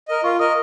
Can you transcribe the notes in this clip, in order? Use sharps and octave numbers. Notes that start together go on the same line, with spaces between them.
A#4 D#5
F4 C#6
A#4 D#5 D#6